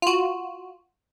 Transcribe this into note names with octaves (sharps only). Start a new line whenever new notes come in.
F4 F#4